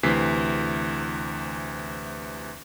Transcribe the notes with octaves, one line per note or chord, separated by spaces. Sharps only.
D2 C3 E3 B6 C7